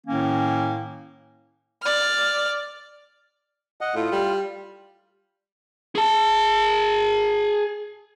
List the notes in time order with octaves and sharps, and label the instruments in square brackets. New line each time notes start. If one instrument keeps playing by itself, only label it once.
[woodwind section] A2 D#3 A#3 C#4
[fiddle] D5 F6
[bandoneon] D#5 F#5
[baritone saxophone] A2 [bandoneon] F4
[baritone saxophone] G3
[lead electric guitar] G#4 A5